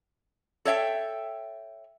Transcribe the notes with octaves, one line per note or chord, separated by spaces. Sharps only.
A4 C#5 E5 G5